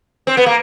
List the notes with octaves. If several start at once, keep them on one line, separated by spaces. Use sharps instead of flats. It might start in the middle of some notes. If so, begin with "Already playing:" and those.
C4
B3
A#3